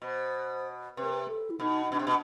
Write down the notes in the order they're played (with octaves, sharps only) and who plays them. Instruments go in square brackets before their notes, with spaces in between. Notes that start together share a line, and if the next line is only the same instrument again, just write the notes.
[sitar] B2 [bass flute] C5
[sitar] C3 [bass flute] B4
[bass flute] A#4
B4
A4
E4
[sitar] B2 [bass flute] D#4
[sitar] B2 [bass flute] D4
[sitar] C3
B2